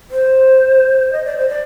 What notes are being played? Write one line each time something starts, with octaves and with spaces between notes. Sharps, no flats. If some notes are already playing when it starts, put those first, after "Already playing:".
C5
D#5
D5
C5
D5